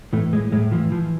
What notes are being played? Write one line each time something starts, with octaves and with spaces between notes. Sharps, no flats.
A2 E3 A3
A2 G#3
A2 G#3
E3 F3
E3 F3